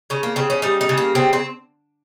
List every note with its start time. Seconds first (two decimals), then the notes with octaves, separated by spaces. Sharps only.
0.10 C#3 C#4
0.23 A#3
0.36 C#3 C4
0.50 C#4
0.62 G3 D#4
0.81 D#4
0.89 C#3
0.97 A#3
1.15 C#3 C4
1.33 C4